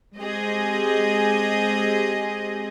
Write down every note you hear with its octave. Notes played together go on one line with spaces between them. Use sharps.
G#3 C4 G4 G#4 D#5